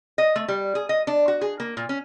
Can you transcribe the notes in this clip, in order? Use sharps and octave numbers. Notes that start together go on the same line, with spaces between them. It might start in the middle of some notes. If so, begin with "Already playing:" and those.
D#5
A3
G3
G#4
D#5
D4
F#4
G#4
A#3
A#2
C#4